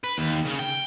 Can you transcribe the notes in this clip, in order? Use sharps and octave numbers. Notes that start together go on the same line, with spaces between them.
B4
D#2
C#3
G5